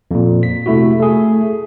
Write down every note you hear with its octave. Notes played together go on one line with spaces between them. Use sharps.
F2 A#2
B6
C3 A3 E4 F#4
A3 G#4